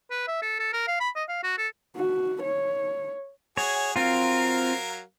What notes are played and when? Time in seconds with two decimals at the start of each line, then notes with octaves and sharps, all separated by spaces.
0.11 B4
0.28 E5
0.42 A4
0.59 A4
0.73 A#4
0.88 F5
1.00 B5
1.15 D#5
1.29 F5
1.43 F#4
1.58 A4
1.96 F#4
2.42 C#5
3.57 F#4 G#4 C#5
3.96 F#3 C4 F4 A#4 F5